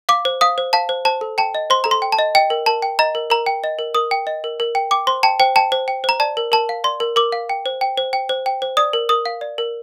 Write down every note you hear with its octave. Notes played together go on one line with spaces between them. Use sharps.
F5 D6
C5
F5 D#6
C5
F5 A5
C5
C5 A5
A4
G5 A5
D#5
C5 C6
A4 A#5
C6
G5
A5
D#5
D#5 G5
A#4
A#4 A5
G5
D#5 A#5
A#4
A#4 A#5
G5
D#5
A#4
A#4 D#6
G5
D#5
A#4
A#4
G5
G5 D6
C5 C6
G5 A5
C5 G5
G5 A5
C5
G5
C5 A#5
D5 A5
A#4
A#4 A5
F5
D5 C6
A#4
A#4 D6
F5
G5
C5
G5
C5
G5
C5
G5
C5
D5 D#6
A#4
A#4 D#6
F5
D5
A#4